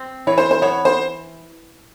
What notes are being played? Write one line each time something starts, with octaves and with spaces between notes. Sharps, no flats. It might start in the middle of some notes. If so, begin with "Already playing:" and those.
Already playing: C4
E3 C#5
C5
C5
B3 C#5
C5